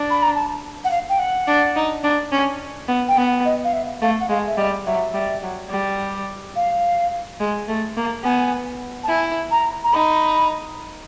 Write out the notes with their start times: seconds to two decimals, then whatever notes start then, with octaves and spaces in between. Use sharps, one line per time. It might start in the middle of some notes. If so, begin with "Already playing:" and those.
Already playing: D4
0.10 B5
0.22 A#5
0.34 A5
0.84 F#5
0.90 F5
1.09 G5
1.19 F#5
1.47 D4
1.76 D#4
2.03 D4
2.32 C#4
2.88 B3
3.08 G5
3.16 B3 F#5
3.45 D#5
3.64 F5
3.73 E5
4.01 A3 F5
4.20 F#5
4.29 G#3 F5
4.47 E5
4.57 G3 D#5
4.86 F#3 E5
5.14 G3
5.42 F#3
5.70 G3
6.56 F5
7.40 G#3
7.68 A3
7.97 A#3
8.24 B3 G#5
9.03 A5
9.08 E4 G#5
9.51 A#5
9.84 A#5
9.93 D#4 B5